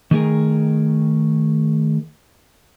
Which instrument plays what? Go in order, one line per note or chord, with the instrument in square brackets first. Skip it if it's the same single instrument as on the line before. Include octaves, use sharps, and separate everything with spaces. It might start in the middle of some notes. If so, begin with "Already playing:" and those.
[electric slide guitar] D#3 A3 G#4 A#4